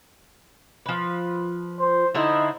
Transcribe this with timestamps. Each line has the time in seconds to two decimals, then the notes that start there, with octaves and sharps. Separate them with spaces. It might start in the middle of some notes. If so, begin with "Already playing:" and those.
0.86 F3 B4
1.80 C5
2.15 D3 D#4 E4 C5